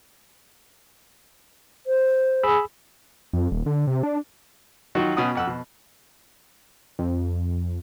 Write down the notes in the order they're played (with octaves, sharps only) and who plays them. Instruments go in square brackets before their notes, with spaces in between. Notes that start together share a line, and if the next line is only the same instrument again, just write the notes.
[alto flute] C5
[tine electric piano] G#4 B5 E6
[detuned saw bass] F2
D#1
D3
C3
D4
[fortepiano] D#3 F#3 D#4 F4 F#4
B2 C#4 F#5 D#6
F2 F#5 E6
B2
[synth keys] F2